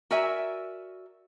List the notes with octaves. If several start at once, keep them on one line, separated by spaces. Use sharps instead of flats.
F#4 A#4 D5 E5 G#5